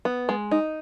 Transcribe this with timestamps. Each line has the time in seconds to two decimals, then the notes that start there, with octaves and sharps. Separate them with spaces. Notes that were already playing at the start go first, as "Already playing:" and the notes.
0.05 B3
0.29 G#3
0.51 D#4